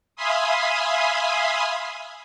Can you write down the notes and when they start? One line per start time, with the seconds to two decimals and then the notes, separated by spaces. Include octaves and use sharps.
0.16 E5 F5 G#5 B5 C6 D#6